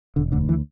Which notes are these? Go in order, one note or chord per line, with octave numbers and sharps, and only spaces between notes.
E1 D3
D2 D3
E3